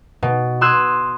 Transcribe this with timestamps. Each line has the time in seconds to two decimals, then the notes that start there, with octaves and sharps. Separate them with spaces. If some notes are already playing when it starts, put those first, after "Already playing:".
0.22 B2
0.61 C6 D#6 E6 F#6 G#6